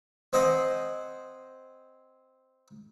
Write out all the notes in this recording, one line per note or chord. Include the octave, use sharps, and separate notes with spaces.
C4 C5 D#5 F#5 G#5